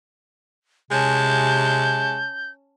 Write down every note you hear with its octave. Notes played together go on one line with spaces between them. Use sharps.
C3 G#3 C#4 A5 G6